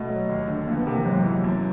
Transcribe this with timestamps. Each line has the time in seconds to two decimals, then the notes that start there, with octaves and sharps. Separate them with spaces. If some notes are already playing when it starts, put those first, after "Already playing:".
Already playing: B2 A3
0.09 F#3
0.29 D#2
0.48 D3
0.67 F2 A#3
0.77 B3
0.86 C3 A#3
0.96 E3
1.05 G#2 F#3
1.24 E3
1.44 F#2